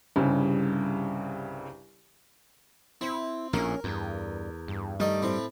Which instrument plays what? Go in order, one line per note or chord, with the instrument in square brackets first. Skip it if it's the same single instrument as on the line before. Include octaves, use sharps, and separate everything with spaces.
[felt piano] C2 G2 C#3
[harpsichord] C4 [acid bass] E4
[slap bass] A#1 A2 [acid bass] C#4 [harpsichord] A#4
[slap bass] E2 [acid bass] G2
[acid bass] G2
[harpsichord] D#3 A3 D#5 [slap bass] G3
[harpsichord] A2 C4